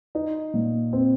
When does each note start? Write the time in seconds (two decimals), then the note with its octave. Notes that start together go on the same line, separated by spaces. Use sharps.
0.15 D#4
0.54 A#2
0.93 C4